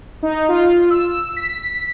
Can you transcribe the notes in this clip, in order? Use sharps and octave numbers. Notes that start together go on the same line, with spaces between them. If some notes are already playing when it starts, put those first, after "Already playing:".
D#4
F4
E6
B6